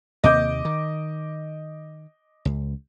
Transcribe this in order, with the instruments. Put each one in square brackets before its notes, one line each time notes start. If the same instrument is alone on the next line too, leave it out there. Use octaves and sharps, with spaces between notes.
[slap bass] D#2 C3 A#3 [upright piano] D#5 D6 G6
[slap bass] D#3
C#2